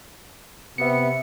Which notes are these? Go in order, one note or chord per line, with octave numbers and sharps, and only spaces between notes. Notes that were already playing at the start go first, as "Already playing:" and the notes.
C3 B3 E5 C#7